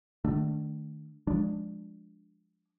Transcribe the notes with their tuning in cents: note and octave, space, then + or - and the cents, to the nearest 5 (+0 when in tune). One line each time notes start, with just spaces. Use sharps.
D#3 -25 A3 +0 D4 +0
F3 +15 G#3 +0 D4 +0